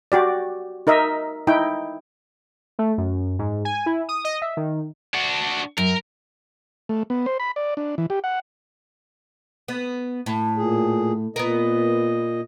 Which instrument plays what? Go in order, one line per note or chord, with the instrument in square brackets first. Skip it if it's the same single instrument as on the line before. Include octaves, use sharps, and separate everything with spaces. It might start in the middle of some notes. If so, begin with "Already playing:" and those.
[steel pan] F#4 G4 D5
D#4 A#4 D#5 E5
D#4 E4 G5
[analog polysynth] A3
F#2
G#2
G#5
E4
D#6
D#5
E5
D#3
[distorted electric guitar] D4 F#4
[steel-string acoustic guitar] F#2 [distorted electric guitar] A#4
[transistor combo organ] A3
B3
C5
B5
D5
D4
E3
G4
F#5
[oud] B3
A2
[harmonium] A#2 G#4
[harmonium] A#2 D#5 [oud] B3 A#4